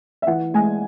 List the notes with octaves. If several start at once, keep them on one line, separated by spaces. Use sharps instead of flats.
E5
E3 F#5
G#3 G#5